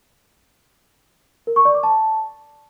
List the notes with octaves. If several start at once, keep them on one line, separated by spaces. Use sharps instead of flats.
A#4
C#6
D5
D6
A5